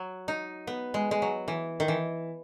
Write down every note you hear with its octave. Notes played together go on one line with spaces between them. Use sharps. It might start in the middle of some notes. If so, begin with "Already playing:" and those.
Already playing: F#3
D#4
B3
G#3
G#3
F#3
E3
D#3
E3